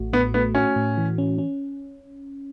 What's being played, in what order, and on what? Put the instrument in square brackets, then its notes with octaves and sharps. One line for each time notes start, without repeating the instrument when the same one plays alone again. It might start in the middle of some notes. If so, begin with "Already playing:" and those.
Already playing: [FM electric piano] A1 A3 F#4
[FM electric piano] A2 [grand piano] B3
[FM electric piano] A3 [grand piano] B3
[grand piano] C#4 [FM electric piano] F#4
[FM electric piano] A2
E3
C#4
C#4